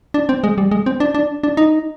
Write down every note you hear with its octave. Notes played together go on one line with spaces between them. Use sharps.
D4
C4
G#3
G3
G#3
C4
D4
D4
D4
D#4